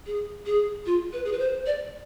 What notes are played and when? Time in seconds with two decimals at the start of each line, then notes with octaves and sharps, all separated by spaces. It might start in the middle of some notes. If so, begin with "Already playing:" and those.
0.06 G#4
0.46 G#4
0.86 F4
1.13 B4
1.25 G#4
1.32 B4
1.39 C5
1.66 D5